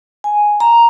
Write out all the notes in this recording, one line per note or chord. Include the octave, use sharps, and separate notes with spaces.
G#5
A#5